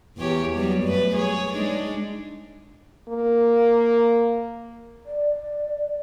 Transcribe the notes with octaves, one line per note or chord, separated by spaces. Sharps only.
E2 G4 C#5
F#3 G3 B3
F#2 A3 B4
G#4 C#5
G#3 D4 D#4
A#3
D5